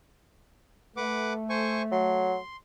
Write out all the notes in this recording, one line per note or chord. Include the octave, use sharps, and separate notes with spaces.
A3 B4 F#5 D6
C5 G#5 C#6
F#3 C6